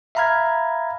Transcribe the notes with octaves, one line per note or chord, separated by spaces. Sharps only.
E5 F5 A#5 B5 F6 G#6